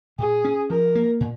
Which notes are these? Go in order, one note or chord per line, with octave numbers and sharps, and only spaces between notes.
A#2 G#4
C#4
F3 A#4
A#3
A#2